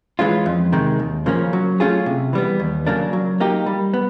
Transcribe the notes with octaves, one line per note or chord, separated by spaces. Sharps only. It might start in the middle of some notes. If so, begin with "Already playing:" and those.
E3 G#3 C#4 F4
F2
C3 D#3 G#3
D#2
C#3 F3 A#3 C#4
F#3
A3 C#4 F4 G#4
C3
E3 G3 B3
D#2
C#3 F#3 A#3 D4
F#3
A#3 D#4 G4
G3
B3